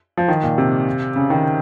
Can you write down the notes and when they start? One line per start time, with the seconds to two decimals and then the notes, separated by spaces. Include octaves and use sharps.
0.17 F3
0.28 D#3
0.43 A#2
0.58 C3
1.16 C#3
1.30 D#3